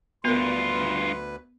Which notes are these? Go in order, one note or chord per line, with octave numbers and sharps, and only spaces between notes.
D2 G2 B3 F4 A#4 B4 C6